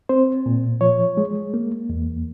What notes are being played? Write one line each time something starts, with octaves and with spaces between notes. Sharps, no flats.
C4 C5
A#2
F3 C#5
G#3
A#3
E2